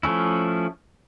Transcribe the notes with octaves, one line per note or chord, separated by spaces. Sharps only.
F3 A3 C#4 E4